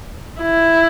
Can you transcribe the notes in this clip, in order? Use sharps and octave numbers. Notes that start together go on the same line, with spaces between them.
E4